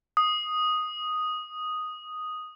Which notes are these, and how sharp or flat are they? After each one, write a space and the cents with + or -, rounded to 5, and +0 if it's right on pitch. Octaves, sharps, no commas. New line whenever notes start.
D#6 +0